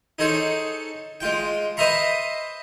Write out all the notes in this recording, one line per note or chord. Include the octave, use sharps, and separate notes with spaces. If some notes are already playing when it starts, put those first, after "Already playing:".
D#4 G#4 A4 C5 C#5
G#3 F4 G5
B4 C5 D#5 E5 A#5 C6